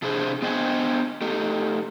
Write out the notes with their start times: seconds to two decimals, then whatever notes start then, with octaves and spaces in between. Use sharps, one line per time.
0.02 C3 D4 E4 G#4 C5
0.42 B3 D4 C5 D#5 G5 G#5
1.21 A3 D#4 G4